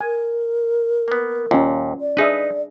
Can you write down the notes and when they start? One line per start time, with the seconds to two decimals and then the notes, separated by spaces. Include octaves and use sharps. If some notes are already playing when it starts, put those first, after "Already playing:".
0.01 A#4 G#5
1.08 A#3 B3
1.51 D#2 A#2 C#4 F4
2.01 D5
2.17 D4 D#4 G#4 B4 E5